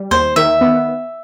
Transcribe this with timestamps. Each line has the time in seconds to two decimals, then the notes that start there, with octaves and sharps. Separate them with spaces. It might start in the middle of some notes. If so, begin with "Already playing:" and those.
Already playing: G3
0.11 D#2 C5
0.36 D#3 E5
0.61 B3